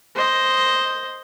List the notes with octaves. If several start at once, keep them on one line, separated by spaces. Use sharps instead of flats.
C5 D#5